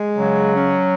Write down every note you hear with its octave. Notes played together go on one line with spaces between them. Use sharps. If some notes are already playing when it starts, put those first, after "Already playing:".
Already playing: G#3
C#3 F#3
C#4